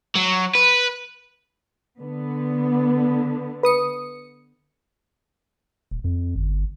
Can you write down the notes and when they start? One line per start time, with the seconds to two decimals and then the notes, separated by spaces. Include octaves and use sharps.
0.15 F#3
0.55 B4
1.99 D3 B3
3.63 B4 D#6 C#7
5.91 D#1
6.04 F2
6.36 G1